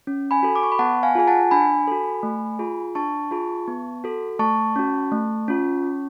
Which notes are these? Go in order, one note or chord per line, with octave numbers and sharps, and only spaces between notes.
C#4
G#5 B5
F#4 A4
D6
C#6
B5
B3 F#5 A5
F5 G#5
F4 G#4 G#5
F#5 A5
D4 G#5 B5
F#4 A4
A3
F4 G#4
D4 A5 C#6
F4 G#4
B3
F#4 A4
A3 A5 C#6
C#4 F#4
A3
C#4 F4
C#4